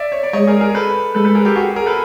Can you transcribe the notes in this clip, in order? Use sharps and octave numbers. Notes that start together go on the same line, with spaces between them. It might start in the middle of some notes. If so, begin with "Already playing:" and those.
Already playing: D5 E5
C#5
D5
G#3 C#5 D#5
G#4 A#4
G#4 A#4
A4 B4
G#3 A4 B4
A4 B4
G#4 A#4
G4 A4
F#4 G#4
G#4 A#4
A4 B4